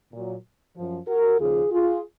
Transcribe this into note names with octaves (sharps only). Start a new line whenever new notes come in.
A#2 F#3
F#2 F3
F#4 A#4
D#2 C#3 F3 F4 G#4
F4 G#4